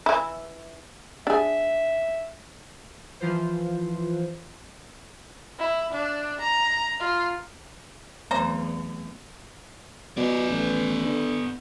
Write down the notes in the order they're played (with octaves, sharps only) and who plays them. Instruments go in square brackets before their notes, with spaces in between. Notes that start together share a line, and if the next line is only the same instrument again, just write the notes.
[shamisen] E3 E4
[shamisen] D4 G#4 [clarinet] E5
[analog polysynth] E3 F3 F4 B4 C5
[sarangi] E4
D4
A#5
F4
[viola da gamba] E2 [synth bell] F#3 A3 C4 [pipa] C5 A#5
[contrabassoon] B2 [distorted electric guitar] B3 D5
[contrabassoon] A1
D3